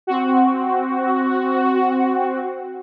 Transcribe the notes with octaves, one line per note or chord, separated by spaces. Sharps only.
C4 F#4